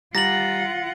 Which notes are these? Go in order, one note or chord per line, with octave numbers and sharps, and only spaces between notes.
G3 F4 F#5 A#5 A6 A#6 F#7